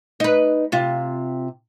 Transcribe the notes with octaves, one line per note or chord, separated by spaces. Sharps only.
D#4 B4
C3 F4